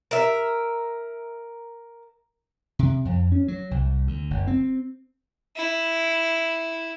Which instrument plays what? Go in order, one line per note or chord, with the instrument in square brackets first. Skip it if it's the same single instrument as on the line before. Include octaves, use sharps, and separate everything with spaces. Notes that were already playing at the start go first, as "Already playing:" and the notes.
[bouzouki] A#4 E5
[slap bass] C3
F2
C#4
F#3
C2
D2
F#1
C4
[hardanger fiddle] E4